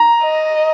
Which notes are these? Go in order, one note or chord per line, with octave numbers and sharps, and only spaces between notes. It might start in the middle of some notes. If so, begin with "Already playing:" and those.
Already playing: A#5
D#5